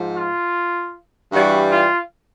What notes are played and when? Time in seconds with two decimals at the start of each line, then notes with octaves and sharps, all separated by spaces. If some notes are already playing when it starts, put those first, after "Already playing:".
Already playing: G#2 F3
0.14 F4
1.31 G2 E3 G3 F#4
1.70 F4